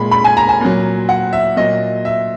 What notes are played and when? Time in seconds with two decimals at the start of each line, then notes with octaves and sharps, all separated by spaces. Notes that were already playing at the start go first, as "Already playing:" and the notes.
Already playing: A#2 G#3 B5
0.11 B5
0.24 G#5
0.37 A#5
0.49 G#5
0.61 A#2 F#3
1.09 F#5
1.33 E5
1.57 A#2 F#3 D#5
2.05 E5